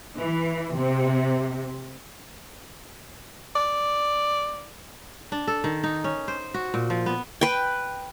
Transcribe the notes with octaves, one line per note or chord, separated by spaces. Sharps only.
E3
C3
D5
D4
A4
D#3
D#4
C#4
C5
F#4
A#2
F3
B3
B4 G5